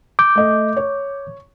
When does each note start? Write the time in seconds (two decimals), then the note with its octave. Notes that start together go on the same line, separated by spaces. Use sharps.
0.19 D6 G6
0.36 A3 D#5
0.77 C#5